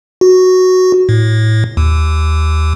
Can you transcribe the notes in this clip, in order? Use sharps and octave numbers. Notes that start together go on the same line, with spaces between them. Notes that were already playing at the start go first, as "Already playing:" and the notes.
F#4
A2
D#2